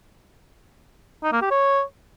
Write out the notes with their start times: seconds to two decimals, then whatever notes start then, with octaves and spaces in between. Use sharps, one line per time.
1.23 D#4
1.32 A#3
1.41 G4
1.51 C#5